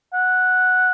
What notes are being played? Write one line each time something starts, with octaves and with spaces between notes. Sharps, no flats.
F#5